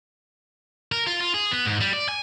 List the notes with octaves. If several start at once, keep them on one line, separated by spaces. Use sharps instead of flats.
A#4
F4
F4
G#4
B3
G#2
G3
D5
G#5